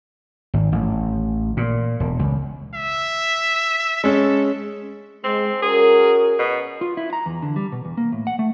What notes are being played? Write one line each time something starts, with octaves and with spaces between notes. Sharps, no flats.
G#1
A1
A#2
E1
C#2
E5
G#3 C#4 A4
G#3 C4
C#4 F#4 G#4 A#4
B2
F4
E4
A#5
E2
D3
G3
B2
E2
A#3
A2
F#5
A3